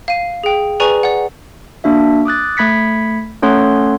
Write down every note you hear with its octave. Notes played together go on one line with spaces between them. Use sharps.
F5 D#7
G#4 G5
G#4 B4 D5 G#5 A#5 C#6
D5 F#5
A#3 D4 F#4 E5
D6 D#6 F#6 A6
A3 B5 G#6 B6 C#7
A3 C#4 A4 C#5 F#5 C6